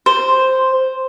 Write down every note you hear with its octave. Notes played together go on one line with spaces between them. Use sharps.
C5